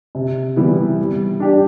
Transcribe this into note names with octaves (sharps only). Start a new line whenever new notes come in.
C3
E3 G3 B3 E4
G3
D4 G4 D5